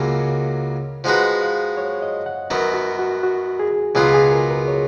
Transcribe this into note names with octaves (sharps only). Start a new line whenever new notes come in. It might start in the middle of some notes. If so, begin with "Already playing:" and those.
Already playing: C#2 C#3 F#3 A#3 C#4 A#4
F3 G#3 D#4 F#4 B4 F#5
F5
C#5
D#5
F#5
F#2 D#3 F#3 B3
F#4
F#4
F#4
G#4
C#2 B2 F#3 B3 F4 G#4
G#4
A#4
B4
C#5